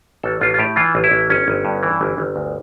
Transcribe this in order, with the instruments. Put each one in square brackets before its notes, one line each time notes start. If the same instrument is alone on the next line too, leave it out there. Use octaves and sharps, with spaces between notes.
[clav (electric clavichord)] A1 A4
A1 F4
F4
A2 G4
E3 F4
A1
E4
A1
G1 C#4
G1
G2
E3
G1
G1
D2